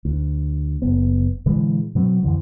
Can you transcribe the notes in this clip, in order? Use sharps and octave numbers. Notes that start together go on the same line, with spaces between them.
D2
F#1 B3
A#2 D3 E3 G#3
B2 F#3 A3 C4
F2 D3 E3